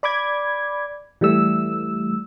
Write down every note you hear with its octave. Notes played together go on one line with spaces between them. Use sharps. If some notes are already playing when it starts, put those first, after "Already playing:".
D5 B5 D6 G#6
E3 G3 A3 E6